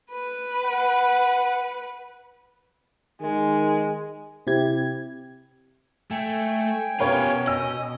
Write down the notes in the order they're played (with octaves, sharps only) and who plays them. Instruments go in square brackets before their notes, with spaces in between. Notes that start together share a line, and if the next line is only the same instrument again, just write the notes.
[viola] B4
[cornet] F#5
[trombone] D#3 [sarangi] G#3
[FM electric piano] C3 C4 E4 G4 G#6
[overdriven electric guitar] A3 [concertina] G5 G#5
[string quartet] B2 C#4 [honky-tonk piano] B3 A#4 C#5 [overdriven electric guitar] F4 G4
[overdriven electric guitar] D#5 [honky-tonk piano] E6